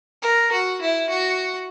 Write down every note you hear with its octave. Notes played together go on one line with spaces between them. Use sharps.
A#4
F#4
E4
F#4